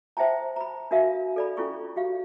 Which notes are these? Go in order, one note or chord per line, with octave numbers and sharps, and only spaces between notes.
C5 E5 G5 A5 A#5
A#5 B5
D4 F#4 A#4 E5 F5
A4 D5 B5
C#4 E4 F4 A4 C#6
F#4 G4 F5